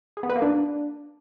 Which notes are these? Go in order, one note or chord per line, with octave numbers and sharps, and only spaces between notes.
G#4
B3
B4
A#3
D4